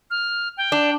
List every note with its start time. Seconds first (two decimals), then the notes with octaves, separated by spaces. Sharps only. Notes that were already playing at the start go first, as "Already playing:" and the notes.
0.10 F6
0.57 G5
0.72 D4